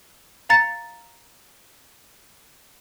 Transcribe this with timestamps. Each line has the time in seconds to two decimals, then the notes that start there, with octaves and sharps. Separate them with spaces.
0.49 F5 A#5 A6 C#7